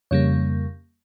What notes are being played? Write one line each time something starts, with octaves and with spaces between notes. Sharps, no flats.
F2 C#3 G3 A#3 C#5